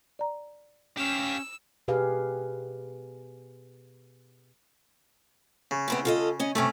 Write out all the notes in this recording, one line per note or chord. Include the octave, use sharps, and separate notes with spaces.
D5 A#5
C#4 G4 F5 E6
B2 G4 G#4 B4 F5
C#3
B3 C4 E4
F4 A4 D#5
C#4 D#5
D2 G2 C3 A3 C#4